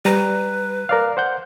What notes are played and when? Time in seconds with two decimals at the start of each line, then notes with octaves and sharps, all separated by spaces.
0.05 G3 B4 A#5
0.89 A#4 D5 F5
1.17 C5 F#5 G6